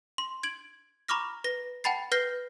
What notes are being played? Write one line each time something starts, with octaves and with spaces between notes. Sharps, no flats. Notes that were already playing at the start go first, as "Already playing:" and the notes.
C6
G#6 D7 F#7
A#5 B5 C#6 D6 F6 A#6
B4 A#6
F#5 G5 A5 B5 A6 C7
B4 F6 G6 A#6 C7 G7